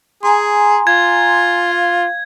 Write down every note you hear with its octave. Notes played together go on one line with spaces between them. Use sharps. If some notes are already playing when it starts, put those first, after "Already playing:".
G#4 G#5 A#5 C6
F4 G#6
F5